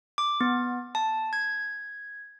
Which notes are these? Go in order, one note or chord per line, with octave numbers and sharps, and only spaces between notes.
D6
B3
A5
G#6